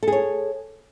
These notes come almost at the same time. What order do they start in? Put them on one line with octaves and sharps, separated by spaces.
A4 G#4 C#5